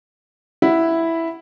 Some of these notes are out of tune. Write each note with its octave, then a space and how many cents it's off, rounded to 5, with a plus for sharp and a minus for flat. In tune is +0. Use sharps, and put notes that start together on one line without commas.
E4 +0 F#5 +0